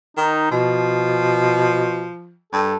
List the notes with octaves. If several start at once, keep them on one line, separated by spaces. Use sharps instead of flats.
D#3 D#4
B2 F3
G2 A4